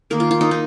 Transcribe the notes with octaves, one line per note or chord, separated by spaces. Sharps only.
D#3 A#3 A#4
F4
F4
D#4
D#4